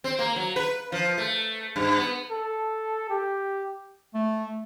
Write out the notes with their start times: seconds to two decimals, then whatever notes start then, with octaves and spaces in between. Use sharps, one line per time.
0.04 C4
0.19 A#3
0.36 F#3
0.56 B4
0.92 F3
1.18 A3
1.76 G2
1.97 B3
2.30 A4
3.10 G4
4.14 A3